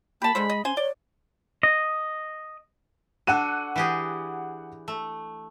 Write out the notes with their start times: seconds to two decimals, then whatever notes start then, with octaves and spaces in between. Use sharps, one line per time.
0.22 A#3 G4 A5 B5
0.35 D3 G#3 A4 C5
0.50 D#5
0.65 C#4 C5 G#5 G7
0.77 C#5 D5
1.63 D#5
3.27 D4 F#4 A4 F#5 F#6 D#7
3.76 E3 G4 G#4
4.88 A3